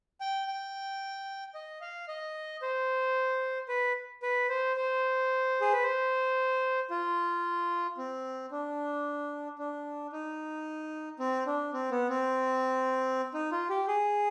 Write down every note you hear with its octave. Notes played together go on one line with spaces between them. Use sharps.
G5
G5
D#5
F5
D#5
C5
B4
B4
C5
C5
G#4
B4
C5
F4
C4
D4
D4
D#4
C4
D4
C4
B3
C4
D#4
F4
G4
G#4